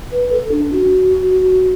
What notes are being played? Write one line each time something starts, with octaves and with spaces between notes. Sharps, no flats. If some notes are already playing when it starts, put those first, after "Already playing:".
B4
A4
D4
F#4